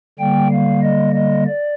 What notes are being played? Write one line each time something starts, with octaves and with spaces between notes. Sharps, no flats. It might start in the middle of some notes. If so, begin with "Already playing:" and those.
D3 G3 A#3 G5
F5
D#5
D#5
D5